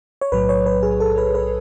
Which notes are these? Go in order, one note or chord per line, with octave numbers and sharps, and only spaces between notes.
C#5
B1 A2 F#3 B4
C#5
B4
G#4
A4
B4
B4